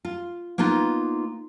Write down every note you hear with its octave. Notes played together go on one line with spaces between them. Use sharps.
F4
A#3 B3 D#4 F4 B4